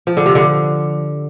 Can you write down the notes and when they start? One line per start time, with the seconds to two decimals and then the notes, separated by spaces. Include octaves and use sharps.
0.07 F3
0.17 D3
0.26 C3
0.35 D3